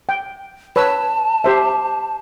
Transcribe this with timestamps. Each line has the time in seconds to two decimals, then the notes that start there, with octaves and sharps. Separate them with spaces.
0.09 G5
0.76 B4 C#5 A5 E6
1.44 G4 C5 E5